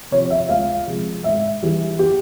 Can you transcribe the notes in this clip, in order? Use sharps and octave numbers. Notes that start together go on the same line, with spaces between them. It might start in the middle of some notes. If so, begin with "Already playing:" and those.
C3 F3 C#5
E5
C#2 F5
C3 F3 G#3
G#2 E5
E3 G3
G4